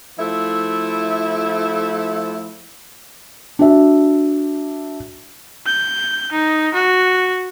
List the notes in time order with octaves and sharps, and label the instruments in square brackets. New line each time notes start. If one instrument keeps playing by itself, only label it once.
[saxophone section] F3 A3 E4
[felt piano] D4 F#4 E5
[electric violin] G6
D#4
F#4